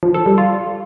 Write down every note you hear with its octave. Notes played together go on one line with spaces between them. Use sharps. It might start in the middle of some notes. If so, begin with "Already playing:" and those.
F3
A4
G3
F4